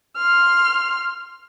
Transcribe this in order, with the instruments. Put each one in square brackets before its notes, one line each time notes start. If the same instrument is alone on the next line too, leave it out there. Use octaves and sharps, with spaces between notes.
[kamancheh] C6 F6